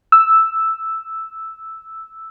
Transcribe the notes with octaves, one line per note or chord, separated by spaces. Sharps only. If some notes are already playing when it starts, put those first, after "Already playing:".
E6